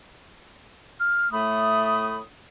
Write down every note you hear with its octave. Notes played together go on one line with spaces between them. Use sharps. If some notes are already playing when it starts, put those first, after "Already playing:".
F6
A2 A3 B5 D#6